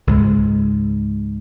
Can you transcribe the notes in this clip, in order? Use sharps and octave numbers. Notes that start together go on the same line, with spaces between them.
C#2 G#2 G#3